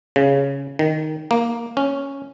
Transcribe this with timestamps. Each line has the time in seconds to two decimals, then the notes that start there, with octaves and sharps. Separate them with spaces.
0.16 C#3
0.79 D#3
1.31 A#3
1.77 C#4